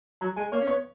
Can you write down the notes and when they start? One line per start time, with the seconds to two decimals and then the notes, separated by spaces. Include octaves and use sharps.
0.21 F#3 A#5
0.36 G#3 G#5
0.52 A#3 C#5
0.61 C#4
0.67 B3 C#5